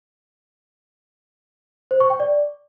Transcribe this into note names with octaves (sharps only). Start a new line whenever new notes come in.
C5
C#6
G5
D5